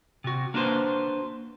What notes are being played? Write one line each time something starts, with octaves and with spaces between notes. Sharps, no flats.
C3 F#4
A#3 D4 F#4 B4 C5